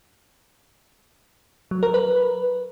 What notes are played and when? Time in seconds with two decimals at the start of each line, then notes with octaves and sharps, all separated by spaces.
1.71 F#3
1.83 A#4
1.94 B4